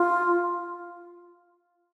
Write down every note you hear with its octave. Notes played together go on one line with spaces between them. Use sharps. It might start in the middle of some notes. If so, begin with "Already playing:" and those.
Already playing: F4